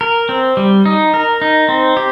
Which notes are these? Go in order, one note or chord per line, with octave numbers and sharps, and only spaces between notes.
A#4
C4
G3
D#4
A#4
D#4
C4
G4